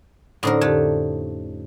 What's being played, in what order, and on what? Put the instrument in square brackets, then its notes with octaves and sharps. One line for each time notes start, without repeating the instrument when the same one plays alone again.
[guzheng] A2 D3 A#4 [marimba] C#4 D#4 C5
[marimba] F2 D3 G4 [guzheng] A3